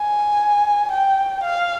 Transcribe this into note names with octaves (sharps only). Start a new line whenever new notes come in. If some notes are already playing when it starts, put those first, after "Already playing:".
Already playing: G#5
G5
F5